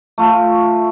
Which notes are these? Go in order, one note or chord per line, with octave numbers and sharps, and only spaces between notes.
A3 F4